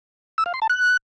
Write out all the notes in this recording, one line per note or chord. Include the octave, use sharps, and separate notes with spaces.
E6
F5
C6
A5
F#6